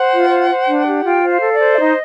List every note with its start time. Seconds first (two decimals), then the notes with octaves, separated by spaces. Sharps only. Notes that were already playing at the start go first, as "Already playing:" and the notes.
Already playing: C5 F#5
0.12 F4
0.30 C5
0.49 C5
0.67 D4
0.86 G4
1.04 F4 G5
1.23 C5
1.29 F5
1.41 A4
1.53 D5
1.59 C5
1.74 E5
1.78 D#4 D#5